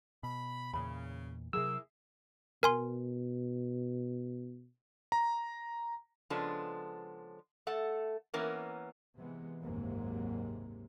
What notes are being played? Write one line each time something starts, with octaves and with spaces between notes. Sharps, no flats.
B2 B5
E2 A#2 C#3 B5
C3 F#3 A#3 E4 G#4 E6
B2 A#4 G#5 C6
A#5
C#3 F3 G#3 B3 D4 A4
A3 A4 F#5
E3 A#3 B3 C#4 A#4
C3 E3 G#3 B3
F#1 D#2 G#2 C3 F#3 A#3